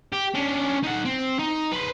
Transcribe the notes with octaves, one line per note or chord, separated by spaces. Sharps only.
G4
C#4 D4
D#4 F#5
C4
D#4
B4 C5